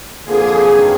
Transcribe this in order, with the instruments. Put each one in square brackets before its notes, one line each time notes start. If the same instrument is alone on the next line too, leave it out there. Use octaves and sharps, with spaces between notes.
[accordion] F2 D3 F3 A#3 [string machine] G#4
[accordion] G2 D#3 F#3